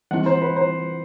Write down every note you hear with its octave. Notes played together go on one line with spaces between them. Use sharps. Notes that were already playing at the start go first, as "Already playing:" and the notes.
E3 G3 C4 E4 F#5
C5
B4
C5